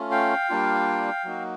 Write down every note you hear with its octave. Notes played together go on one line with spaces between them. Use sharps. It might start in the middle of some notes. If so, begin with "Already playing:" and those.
Already playing: A3 C#4 F4
F5 G5
G3 A#3 D4 F4
F#3 A#3 D#4 F#4